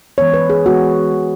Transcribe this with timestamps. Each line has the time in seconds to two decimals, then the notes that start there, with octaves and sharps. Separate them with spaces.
0.18 E3 G#3 B3 C#5
0.34 B4
0.50 G#4
0.66 E3 G#3 B3 F#4
1.14 E3 G#3 B3